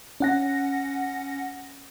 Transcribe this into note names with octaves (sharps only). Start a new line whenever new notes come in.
C#4 F#5 A#6